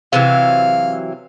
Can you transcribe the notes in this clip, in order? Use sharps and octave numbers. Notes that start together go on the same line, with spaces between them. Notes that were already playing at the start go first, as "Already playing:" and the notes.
C3 E3 F#3 F5